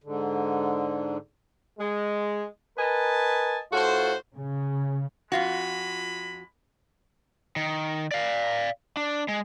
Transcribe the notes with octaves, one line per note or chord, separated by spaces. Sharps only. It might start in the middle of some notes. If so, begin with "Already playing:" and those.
G#2 D3
G#3
A#4 B4 D#5 G#5 A5
A2 F4 F#4 A4 C5
C#3
F2 G#3 F4 F#4 B5
D#3
D5 F5
D4
G#3